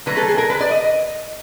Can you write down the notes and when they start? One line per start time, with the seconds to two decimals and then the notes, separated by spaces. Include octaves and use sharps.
0.06 D3 F#3 A3 B4
0.17 A4
0.28 G#4
0.38 A#4
0.50 B4
0.61 D5
0.71 D#5